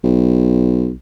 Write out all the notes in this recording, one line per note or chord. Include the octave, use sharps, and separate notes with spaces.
B1